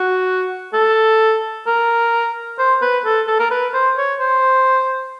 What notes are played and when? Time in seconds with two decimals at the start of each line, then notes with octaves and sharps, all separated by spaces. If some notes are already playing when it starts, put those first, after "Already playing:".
Already playing: F#4
0.74 A4
1.67 A#4
2.59 C5
2.82 B4
3.05 A4
3.27 A4
3.39 A#4
3.51 B4
3.74 C5
3.98 C#5
4.20 C5